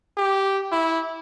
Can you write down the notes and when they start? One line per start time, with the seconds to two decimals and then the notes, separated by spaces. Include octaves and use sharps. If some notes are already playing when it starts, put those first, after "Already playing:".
0.17 G4
0.72 E4